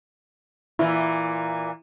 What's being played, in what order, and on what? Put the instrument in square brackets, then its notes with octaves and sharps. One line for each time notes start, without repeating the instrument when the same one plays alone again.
[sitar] A#2 E3 [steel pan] E4